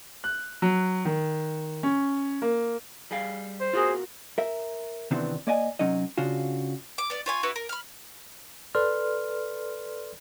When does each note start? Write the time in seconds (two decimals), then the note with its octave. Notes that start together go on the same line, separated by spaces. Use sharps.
0.24 F#6
0.62 F#3
1.05 D#3
1.83 C#4
2.42 A#3
3.11 G3 G#4 F5
3.61 C5
3.73 F4 F#4 G#4 A#4 D#6
4.38 A#4 E5
5.11 C3 D#3 E3 B3 C4 D4
5.47 A#3 D5 D#5 G#5
5.79 C3 F#3 C#4 D#4 D#5
6.18 C#3 D4 F4 F#4
6.98 D6
7.10 B3 D5
7.26 F4 C#5 G#5
7.43 E4 F#4 B4 C#6
7.56 A#4
7.69 B5 F6
8.75 A4 B4 D5 C6 F6